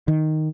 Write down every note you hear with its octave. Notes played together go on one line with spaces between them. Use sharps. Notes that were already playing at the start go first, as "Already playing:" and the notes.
D#3